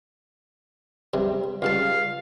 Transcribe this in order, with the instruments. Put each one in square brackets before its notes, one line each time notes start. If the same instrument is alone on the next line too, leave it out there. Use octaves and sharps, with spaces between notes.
[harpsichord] G2 C3
[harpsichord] C#2 G2 A5 [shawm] F5